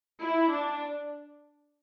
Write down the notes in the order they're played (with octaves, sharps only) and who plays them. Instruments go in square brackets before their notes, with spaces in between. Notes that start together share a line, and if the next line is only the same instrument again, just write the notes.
[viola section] E4
D4